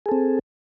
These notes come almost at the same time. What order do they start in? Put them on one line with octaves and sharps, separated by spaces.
G#4 A4 C4